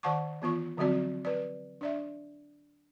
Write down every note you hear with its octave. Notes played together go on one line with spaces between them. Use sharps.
D#3 D5 F#5 A5 C#6 D6
E3 B3 F4 C#6
D3 F3 F#3 C4 F#4 D5
B4 D5
D4 D5 E5